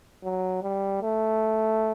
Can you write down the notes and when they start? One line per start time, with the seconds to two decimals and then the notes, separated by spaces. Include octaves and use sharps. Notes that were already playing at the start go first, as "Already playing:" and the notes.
0.24 F#3
0.63 G3
1.02 A3